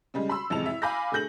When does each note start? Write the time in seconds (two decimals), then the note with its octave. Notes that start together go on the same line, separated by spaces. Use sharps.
0.14 C#3 G3 G#3
0.29 B5 C6 E6
0.50 A1 F2 C3 G#3 A5 F7
0.66 E4 E5
0.82 F5 G#5 B5 D6 G6 A#6
1.12 D3 A3 G#4 G6 A#6 F#7